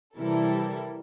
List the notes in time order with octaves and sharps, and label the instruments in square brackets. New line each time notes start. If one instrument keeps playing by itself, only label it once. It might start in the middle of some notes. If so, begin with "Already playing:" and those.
[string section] C3 E3 G3 E4 A4 A#4